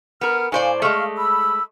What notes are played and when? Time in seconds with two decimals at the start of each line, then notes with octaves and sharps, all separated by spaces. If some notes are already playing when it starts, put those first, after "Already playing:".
0.21 B3 A#4 F6
0.52 A2 C5 D5 F5 G#5
0.82 G#3 A3 F5 C#6 F6
1.17 B5 E6